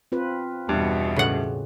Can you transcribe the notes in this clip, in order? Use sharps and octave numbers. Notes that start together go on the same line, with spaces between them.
C4 F4 B4
E2 G2 B2
A2 C#3 F#5